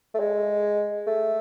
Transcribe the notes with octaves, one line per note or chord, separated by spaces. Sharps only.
A3
G#3
A3